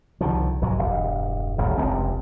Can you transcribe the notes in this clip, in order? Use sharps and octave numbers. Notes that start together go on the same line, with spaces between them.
C2 D3 D#3 F3
B1 G#2 F#3 G#3
E1 G2
D#1 A1 F#2 C#3
F1 C#2 C3 C4